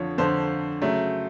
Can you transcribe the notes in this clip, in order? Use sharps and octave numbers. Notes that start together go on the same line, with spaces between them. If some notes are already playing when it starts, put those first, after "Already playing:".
Already playing: F2 D3 F3 C#5
F2 D3 F3 C5
C#3 F#3 A3